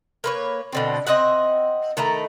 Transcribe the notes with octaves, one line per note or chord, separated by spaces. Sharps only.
A#3 B4 C#5
B2 D3 C4
C4 D#5 E5 F#5
D#3 A3 E4 A#5